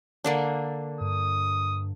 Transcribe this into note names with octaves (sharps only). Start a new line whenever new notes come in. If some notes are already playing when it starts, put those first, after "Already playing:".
D3 A#3 D4
G2 D#6